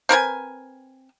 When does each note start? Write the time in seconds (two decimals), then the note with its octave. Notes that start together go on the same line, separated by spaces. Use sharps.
0.09 C4 A#4 B4 G#5